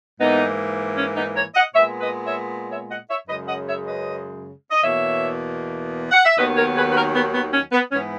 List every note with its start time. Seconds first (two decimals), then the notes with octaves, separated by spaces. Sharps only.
0.19 G#2 E3 A#3 B3 D#4
0.97 C#4
1.16 B3 D#4
1.35 A#4 C#5
1.55 D#5 F#5
1.73 A#2 G#3 B3 C#5 E5
1.99 B4 D#5
2.25 C#5 E5
2.70 C#5 E5
2.89 D#5 F#5
3.09 C#5 E5
3.28 F#2 C#3 G#3 B4 D#5
3.47 D#5 F#5
3.67 C#5 E5
3.86 B4 D#5
4.71 D#5
4.82 E2 B2 A#3 C#5 E5
6.11 F#5
6.24 E5
6.37 D#2 D#3 F#3 B3 B4 D#5
6.56 A#4 C#5
6.75 G#4 B4
6.89 B4
6.94 F#4 A#4
7.14 B3
7.33 B3
7.52 C#4
7.72 B3
7.91 G#2 E3 B3 C#4